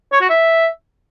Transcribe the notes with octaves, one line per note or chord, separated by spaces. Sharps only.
C#5
F#4
E5